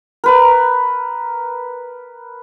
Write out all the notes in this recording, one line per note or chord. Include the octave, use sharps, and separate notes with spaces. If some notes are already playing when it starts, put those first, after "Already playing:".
A#4 B4 A#5